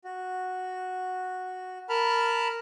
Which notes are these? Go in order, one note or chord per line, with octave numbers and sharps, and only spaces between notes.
F#4
A#4 A5 B5 F6